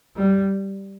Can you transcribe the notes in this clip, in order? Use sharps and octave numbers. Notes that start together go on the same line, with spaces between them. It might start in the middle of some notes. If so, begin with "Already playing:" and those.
G3